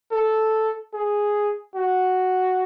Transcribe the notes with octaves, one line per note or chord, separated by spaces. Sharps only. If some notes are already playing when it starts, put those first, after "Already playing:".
A4
G#4
F#4